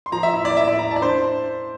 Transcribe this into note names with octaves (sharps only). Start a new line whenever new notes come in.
C6
F3 A#5
E5
E4
D5
E4 E5
D5
E4 A#5
A5
D5
D4 C5